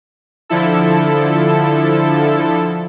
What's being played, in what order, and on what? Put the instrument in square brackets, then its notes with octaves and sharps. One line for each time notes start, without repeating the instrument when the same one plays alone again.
[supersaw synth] D3 F3 E4 A4